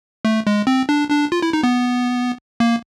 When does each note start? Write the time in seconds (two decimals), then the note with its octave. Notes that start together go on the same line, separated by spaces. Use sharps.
0.25 A3
0.47 G#3
0.67 C4
0.89 D4
1.10 D4
1.32 F4
1.42 E4
1.53 D#4
1.63 B3
2.60 A#3